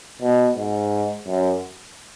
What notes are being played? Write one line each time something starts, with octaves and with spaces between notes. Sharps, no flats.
B2
G#2
F#2